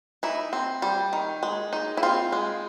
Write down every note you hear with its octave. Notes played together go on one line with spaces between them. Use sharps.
D#4 E4
C4
G3
D#3
G#3
D#4
E4
C4 F4
G#3